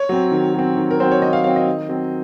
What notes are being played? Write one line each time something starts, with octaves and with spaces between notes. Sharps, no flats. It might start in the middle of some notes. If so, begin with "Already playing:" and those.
Already playing: C#5
F#3 C4
D#3
F#3 C4
D#3
A#4
F#3 C4 C5
C#5
D#3 D#5
F5
F#3 C4 F5
D#5
D#3
F#3 C4